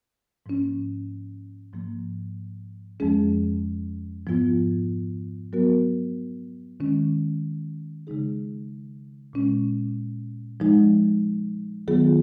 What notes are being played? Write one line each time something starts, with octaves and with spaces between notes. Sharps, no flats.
G#2 F3 A#3 C#4
G#2 F3 A#3
F2 F3 G#3 C#4 G#4
G#2 F3 B3 F4
F#3 B3 F#4 A#4
D#3 G#3 C#4
C#3 G#3 D#4 G#4
A#2 G#3 C#4
F3 G#3 D#4
D#3 F#3 B3 F4 G#4